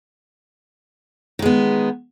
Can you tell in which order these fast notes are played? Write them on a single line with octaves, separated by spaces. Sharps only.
D#3 G#3 B3